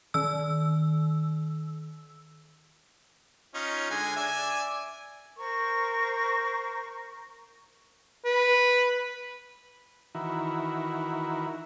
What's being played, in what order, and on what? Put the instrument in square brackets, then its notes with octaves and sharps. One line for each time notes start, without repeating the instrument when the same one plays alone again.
[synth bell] D#3 E6
[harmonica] C#4 D#4 F4
D3 G#3 G#5
D5 E5 G#5
[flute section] A#4 C5 C#6
[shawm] B4
[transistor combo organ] D#3 E3 E4 F#4 A#4